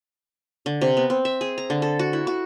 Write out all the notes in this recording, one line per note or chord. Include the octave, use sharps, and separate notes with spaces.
D3
C3
B3
C4
E5
G#4
A#5
D3
A4
F#4
E4
F#4